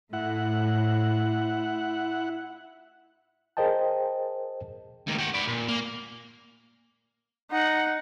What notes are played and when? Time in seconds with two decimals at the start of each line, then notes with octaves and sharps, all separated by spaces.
0.13 A2 E4 F#5
3.57 G#4 A#4 C5 D#5 G5 A5
5.07 C#2 D#3
5.19 G4 F#5
5.34 B4 D5
5.48 A#2
5.69 A#3
7.52 D#4 F#5